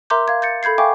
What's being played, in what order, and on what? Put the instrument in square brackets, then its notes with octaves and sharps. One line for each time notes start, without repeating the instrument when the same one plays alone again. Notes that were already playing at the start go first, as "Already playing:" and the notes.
[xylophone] A#4 E5 A#5 C6 D6 G6
F5 G#6
G6 A6 C#7
A4 B5 G6 G#6 C7
E5 F5 G5 G#5 C#6 D6